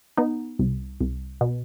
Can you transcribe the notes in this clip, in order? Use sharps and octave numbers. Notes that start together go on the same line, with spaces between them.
B3 D#4
C2
C2
B2